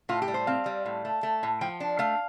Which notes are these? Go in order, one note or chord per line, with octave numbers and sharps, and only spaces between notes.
A2 F4
G4
G3
C5
C4 F5
G3
A2
A3
A3
A2
F3 G5
D4
A3 F5